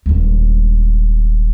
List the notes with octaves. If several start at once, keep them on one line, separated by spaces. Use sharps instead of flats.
D#1 G#3